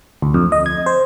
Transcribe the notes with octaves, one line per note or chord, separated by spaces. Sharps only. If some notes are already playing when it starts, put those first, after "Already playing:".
D2
F2
D#5
G#6
C5